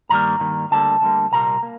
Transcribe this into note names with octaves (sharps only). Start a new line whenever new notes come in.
G2 D#3 G3 A#3 A#5
G2 D#3 G3 A#3
D2 D3 G3 A#3 A5
D2 D3 G3 A#3
C2 A#2 G3 A#3 A#5
A#3